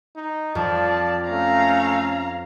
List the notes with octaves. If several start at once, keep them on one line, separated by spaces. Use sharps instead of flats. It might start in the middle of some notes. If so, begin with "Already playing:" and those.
D#4
F2 F3 D5 A5
A3 C#4 F5 A#5